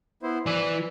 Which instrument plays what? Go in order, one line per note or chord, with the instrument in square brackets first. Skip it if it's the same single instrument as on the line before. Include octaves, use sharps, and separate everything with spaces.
[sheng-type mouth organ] B3 E4 C5
[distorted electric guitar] E3 B4 [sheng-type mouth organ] D5